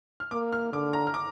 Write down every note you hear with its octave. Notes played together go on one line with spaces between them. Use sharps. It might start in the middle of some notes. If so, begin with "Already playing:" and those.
F6
A#3 D6
F6
D3 D6
A#5
F6
D6